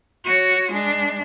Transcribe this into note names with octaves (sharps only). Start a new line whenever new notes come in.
F#4 C#5
G#3 D4